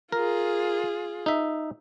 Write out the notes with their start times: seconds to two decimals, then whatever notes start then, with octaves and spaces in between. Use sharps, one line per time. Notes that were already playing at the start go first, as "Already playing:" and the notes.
0.12 F4 G#4 A#4
1.26 D#4 E5